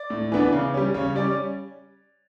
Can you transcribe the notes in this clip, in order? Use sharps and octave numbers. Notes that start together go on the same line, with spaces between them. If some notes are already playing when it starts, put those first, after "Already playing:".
Already playing: D5
A2
E3 B3 D4
C#3
G3 C#4
C#3 C#5
G3 C#4 D5